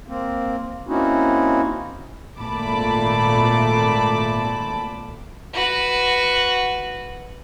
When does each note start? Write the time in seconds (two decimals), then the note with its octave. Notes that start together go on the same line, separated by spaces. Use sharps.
0.08 A#3 C4
0.88 A#3 C4 C#4 D#4 E4 F#4
2.38 G#1 A#2 A3 A5 B5 D6
5.53 F#4 B4